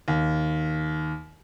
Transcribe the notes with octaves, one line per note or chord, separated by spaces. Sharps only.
D#2